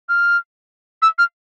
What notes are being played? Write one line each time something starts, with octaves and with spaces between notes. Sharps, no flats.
F6
E6
F6